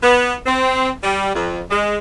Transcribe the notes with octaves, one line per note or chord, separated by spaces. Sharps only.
B3
C4
G3
F2
G#3